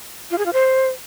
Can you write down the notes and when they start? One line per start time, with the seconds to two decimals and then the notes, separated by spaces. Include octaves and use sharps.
0.31 F4
0.38 G#4
0.46 F4
0.53 C5